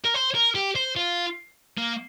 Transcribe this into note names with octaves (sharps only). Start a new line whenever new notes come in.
A#4
C5
A#4
G4
C5
F4
A#3